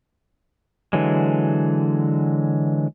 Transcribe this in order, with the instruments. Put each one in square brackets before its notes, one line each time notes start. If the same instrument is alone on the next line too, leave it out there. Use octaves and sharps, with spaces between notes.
[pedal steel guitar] D3 E3 F#3 G#3